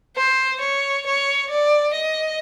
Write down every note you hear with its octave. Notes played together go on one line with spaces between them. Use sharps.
C5
C#5
C#5
D5
D#5